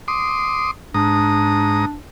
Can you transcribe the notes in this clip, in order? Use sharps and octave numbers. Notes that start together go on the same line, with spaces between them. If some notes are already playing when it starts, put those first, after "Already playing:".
C6 D6 D#6
G#2 D4 A#5 D#6